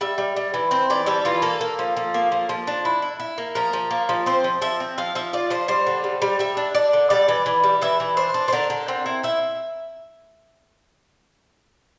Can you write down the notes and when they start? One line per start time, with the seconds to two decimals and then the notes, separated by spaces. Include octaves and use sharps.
0.01 G3 E5
0.18 G3
0.36 G3
0.54 E3
0.71 C4 C5
0.90 E3 D5
1.06 G3 A4
1.25 E3 F4
1.42 A#3 A4
1.61 A#3
1.79 F3
1.97 F3
2.14 A#3
2.32 F3
2.49 F3
2.67 D4
2.85 E4
3.02 E4
3.20 E4
3.38 A#3
3.55 F3 A#4
3.73 F3
3.91 A#3
4.09 F3
4.26 C4 C5
4.44 F3
4.62 F3 E5
4.80 C4
4.98 F3 F5
5.15 F3 E5
5.33 F4 D5
5.50 F3 C5
5.68 G3 C5
5.87 D3
6.04 G3
6.22 G3
6.39 G3 E5
6.57 D4
6.75 D4 D5
6.93 D3
7.10 G3 D5
7.28 E3
7.46 E3
7.64 G3
7.82 E3 E5
8.00 E3
8.17 D4 C5
8.34 D4
8.48 C5
8.53 D3 A#4
8.70 D3
8.88 C4
9.06 E4
9.23 E4 E5